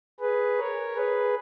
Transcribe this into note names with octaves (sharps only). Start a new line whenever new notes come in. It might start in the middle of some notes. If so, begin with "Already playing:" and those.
G#4 B4
A#4 C#5
G#4 B4